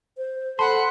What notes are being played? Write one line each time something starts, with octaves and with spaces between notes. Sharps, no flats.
C5
A4 F#5 A5 B5 C6